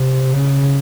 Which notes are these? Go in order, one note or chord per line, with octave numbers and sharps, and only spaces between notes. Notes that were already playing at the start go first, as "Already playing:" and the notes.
Already playing: C3
C#3